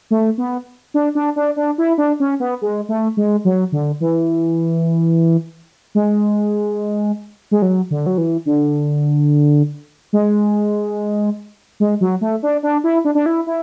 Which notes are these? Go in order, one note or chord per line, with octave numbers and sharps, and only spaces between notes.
A3
B3
D4
D4
D4
D4
E4
D4
C#4
B3
G#3
A3
G#3
F#3
D3
E3
G#3
G#3
F#3
D3
F#3
E3
D3
G#3
G#3
F#3
A3
D4
D4
E4
D4
D4
E4
E4